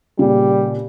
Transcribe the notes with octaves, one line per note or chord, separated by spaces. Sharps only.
A#2 C#3 G3